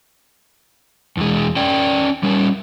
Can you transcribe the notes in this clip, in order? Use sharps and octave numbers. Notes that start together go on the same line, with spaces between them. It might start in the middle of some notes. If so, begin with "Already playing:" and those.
E2 G#3
C#4 D5 G5
G3 C#4